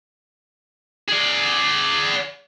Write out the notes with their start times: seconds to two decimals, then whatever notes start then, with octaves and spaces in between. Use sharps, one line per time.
1.09 G#4 D5